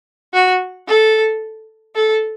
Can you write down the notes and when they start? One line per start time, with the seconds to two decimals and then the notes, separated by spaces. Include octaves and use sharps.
0.34 F#4
0.88 A4
1.95 A4